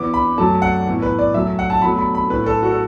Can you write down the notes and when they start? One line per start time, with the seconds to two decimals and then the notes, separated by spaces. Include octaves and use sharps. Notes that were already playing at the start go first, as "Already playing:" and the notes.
Already playing: E2 E3 B3 D6
0.14 B5
0.37 F#2 F#3 A3 A5
0.62 F#5
0.86 A2 E3 B3
1.02 B4
1.19 D5
1.34 F#2 F#3 A3 E5
1.59 F#5
1.70 A5
1.82 B2 F#3 A3 B5
1.98 B5
2.15 B5
2.30 A2 A3 B4
2.46 A4
2.63 F#4
2.71 A4